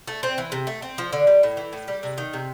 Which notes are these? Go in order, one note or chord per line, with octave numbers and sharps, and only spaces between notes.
A3
C4
E3
C3
A3
C4
F3
D3
G3
A2
E3
A2
G3
C3
D#3
C3